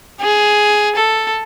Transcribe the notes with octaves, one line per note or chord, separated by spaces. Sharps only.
G#4
A4